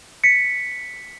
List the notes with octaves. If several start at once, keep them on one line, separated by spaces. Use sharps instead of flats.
B6 C#7